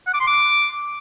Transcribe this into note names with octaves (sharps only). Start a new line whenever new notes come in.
F#5
D6
C6
D6